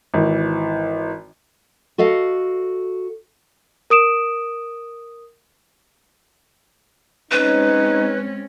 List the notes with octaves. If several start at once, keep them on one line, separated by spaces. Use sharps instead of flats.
G#1 E3
F#4 A4 D#5 F5
A#4 D#6 D7 E7
G#3 C4 C#4 D#4 B4